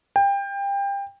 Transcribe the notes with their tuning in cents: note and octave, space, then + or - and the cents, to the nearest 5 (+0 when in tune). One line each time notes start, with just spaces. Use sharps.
G5 +25